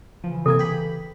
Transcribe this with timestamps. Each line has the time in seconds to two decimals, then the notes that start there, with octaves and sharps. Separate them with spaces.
0.24 C#3 E3 F3
0.46 C3 A#3 A4 G#5
0.59 G4 B5